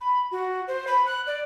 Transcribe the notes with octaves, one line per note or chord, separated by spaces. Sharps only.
B5
F#4
C5
B5
F#6
D5